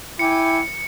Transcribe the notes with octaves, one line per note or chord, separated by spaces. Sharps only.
E4 G5 G#5 D6 C#7